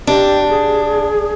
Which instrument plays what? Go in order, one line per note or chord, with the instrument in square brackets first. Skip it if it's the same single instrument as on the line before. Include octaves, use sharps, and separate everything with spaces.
[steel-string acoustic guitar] D4 [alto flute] G4
[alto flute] G#4